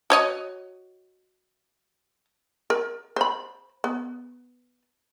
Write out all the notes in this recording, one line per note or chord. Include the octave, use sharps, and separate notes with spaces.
F#4 C#5 D#5
A#4
C5 B5
B3